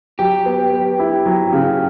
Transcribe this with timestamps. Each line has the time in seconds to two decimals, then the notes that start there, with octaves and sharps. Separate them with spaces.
0.19 F#3 G4
0.46 B3
0.72 B3
0.99 E4
1.25 F#3
1.53 C#3